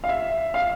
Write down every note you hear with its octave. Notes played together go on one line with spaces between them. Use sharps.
F5
E5
F5